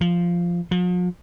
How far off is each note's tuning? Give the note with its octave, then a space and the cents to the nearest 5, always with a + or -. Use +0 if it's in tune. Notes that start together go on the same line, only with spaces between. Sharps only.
F3 -5
F3 +45